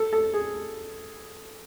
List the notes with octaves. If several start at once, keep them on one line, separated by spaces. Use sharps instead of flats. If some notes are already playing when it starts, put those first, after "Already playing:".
Already playing: A4
A4
G#4